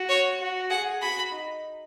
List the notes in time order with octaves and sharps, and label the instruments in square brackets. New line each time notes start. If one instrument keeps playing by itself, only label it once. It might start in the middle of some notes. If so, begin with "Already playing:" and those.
Already playing: [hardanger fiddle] F#4
[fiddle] C#5
[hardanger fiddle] F#4
[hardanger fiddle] G#4 [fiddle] F#5
[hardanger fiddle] F#4 [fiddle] B5
[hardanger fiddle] D#4